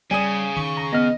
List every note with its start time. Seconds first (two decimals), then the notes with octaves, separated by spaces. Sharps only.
0.11 C#3 G3 G#5 D#6
0.57 D#3 C#6
0.77 A#5
0.93 B3 D#5 F6